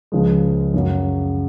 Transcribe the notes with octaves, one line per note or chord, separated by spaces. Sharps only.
C#2 C#3 F3 G#3
F#2 C#3 F#3